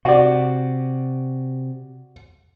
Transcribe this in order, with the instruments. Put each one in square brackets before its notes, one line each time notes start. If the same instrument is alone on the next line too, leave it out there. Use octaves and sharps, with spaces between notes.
[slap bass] C3 [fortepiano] F#4 D5